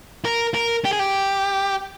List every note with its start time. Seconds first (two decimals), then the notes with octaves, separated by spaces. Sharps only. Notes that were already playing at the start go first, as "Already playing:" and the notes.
0.25 A#4
0.54 A#4
0.85 G4
0.93 G#4
0.99 G4